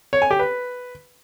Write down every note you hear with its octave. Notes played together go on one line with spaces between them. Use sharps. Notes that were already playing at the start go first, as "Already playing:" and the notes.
C#5
G#5
G4
B4